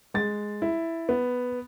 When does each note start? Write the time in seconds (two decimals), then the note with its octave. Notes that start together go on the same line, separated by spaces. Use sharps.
0.14 G#3 A6
0.62 E4
1.09 B3